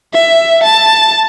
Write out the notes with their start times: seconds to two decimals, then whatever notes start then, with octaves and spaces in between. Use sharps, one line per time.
0.14 E5
0.63 A5